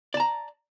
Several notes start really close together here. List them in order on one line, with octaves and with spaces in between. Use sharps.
D5 A5 A#5